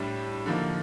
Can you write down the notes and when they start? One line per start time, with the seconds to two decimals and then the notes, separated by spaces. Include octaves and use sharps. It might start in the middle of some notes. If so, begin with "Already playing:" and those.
Already playing: A2 G3 D4
0.46 D3 F3 A#3 D#4